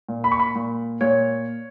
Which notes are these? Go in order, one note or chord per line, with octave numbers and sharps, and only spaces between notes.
A#2
B5
C#6
B5
A#2
A#2 C#5